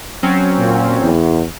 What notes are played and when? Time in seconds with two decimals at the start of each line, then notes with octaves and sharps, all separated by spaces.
0.23 F#3 C4 C#4
0.58 A#2
1.01 E2